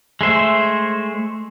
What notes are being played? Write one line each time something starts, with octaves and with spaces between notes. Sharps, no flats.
G#3 A3 C5 E5